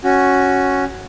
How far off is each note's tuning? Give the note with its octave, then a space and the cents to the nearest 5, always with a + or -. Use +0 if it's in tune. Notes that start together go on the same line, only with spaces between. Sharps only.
C#4 +0 F#4 +0